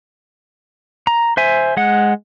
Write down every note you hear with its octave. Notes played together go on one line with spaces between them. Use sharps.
A#5
C5 E5 G#5
G#3 F#5